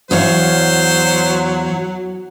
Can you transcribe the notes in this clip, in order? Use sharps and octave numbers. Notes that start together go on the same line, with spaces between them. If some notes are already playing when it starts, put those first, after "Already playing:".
E2 F#3 C5 C#5 F5